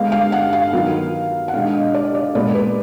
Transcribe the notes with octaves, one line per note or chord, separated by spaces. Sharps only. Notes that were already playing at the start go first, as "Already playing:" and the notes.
Already playing: D3 G#3 B3 D4 F5
F5
F#5
F5
D#3 F#3 B3
F#5
B2 G#3 D4 F5
D#5
D5
D5
A#2 G#3 B3 D5
B4